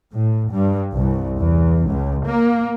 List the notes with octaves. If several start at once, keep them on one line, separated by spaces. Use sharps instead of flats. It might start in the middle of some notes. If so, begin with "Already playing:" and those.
A2
G2
C2
E2
C#2
A#3